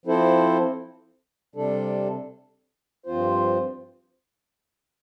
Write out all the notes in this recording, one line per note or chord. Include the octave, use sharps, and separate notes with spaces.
F3 C4 E4 A4 C5
C3 G3 D4 A4
G2 F3 C4 F4 C5